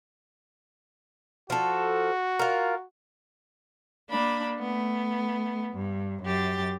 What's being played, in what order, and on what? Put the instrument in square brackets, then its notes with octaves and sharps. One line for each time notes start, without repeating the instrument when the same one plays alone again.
[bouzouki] F3 A4 [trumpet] F#4
[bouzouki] F4 A#4
[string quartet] A#3 D4 B5
A3 B3
G2
F#2 G4 A6